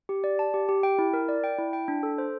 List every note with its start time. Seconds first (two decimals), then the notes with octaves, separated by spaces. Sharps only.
0.09 G4
0.24 D5
0.39 A5
0.54 G4
0.69 G4
0.83 G5
0.99 E4
1.14 A#4
1.29 D5
1.44 G5
1.59 E4
1.73 G5
1.88 D4
2.03 A4
2.18 C5